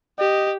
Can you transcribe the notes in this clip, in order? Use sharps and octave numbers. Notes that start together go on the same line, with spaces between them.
G4 D#5